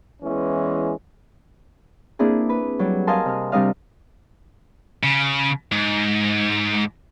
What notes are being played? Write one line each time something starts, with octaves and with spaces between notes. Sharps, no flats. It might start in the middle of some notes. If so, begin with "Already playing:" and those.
E2 E3 G#3 C#4
A#3 C4 D4 E4 G#4
B4
F#3 G3
A#4 D#5 F5 G#5 A5 C6
C3 F6
C3 G3 D4 D#5 F5
C#3
G#2